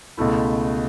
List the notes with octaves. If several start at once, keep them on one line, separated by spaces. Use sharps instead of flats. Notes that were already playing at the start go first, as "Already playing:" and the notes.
C#2 B2 A3 E4